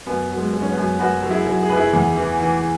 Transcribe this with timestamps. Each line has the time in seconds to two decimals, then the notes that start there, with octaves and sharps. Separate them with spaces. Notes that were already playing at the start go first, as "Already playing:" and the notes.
0.06 F#2 B3
0.30 F#3
0.37 G#3
0.53 F#3
0.62 C#4
0.69 B3
0.77 F#2
0.99 F#2 F#4 B4
1.23 F#3
1.31 E4 G#4
1.46 F#3
1.63 G#4
1.70 F#2 B4
1.76 E4 G#4
1.93 E2
2.17 E3
2.40 E3